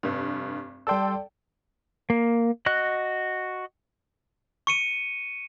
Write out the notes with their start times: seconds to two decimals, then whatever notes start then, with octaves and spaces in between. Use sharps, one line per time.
0.03 F1 G2
0.87 G3 A4 D5 G5 C6 E6
2.10 A#3
2.66 F#4 D#5 F#6
4.67 C#6 C#7 D#7